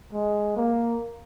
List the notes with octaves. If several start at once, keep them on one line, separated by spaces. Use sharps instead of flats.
G#3
A#3